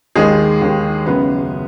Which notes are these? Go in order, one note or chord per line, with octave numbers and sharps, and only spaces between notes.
D#2 D#3 G#3 G#4
D#2 D#3
F#1 F#2 C#3 B3 B4